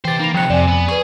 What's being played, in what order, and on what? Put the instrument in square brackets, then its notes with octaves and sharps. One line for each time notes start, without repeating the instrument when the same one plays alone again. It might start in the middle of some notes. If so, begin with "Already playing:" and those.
[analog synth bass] E3 [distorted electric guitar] G4 C5 [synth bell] G5 A6
[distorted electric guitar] A#3 [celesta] D#4 B5 F7
[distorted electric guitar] F2 C3 [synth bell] F3 F#6 [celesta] G5 C#7
[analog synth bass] F2 [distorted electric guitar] C3 [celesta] D5 G#5
[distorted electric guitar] B3
[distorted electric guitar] G#4 [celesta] B4 D#6 [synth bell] C#6 G#6